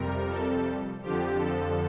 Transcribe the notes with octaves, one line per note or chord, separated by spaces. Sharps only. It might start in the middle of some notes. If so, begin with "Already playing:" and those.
Already playing: F2 C3 G3 A#4
A4
F2 D3 F3 G4
A4